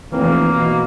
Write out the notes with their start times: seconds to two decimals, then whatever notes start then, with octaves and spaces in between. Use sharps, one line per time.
0.12 F1 E3 A#3
0.55 B2